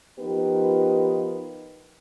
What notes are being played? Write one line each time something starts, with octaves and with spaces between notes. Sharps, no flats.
F3 B3 D#4 G4 A#4 B4